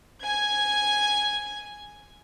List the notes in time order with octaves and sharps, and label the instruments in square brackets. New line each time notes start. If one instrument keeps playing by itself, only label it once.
[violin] G#5 G#6